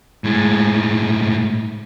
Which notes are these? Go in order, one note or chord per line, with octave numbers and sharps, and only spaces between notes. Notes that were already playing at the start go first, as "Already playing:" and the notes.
A2 G#3